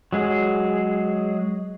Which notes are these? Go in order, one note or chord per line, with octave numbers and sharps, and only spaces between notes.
F#3 G#3 G#4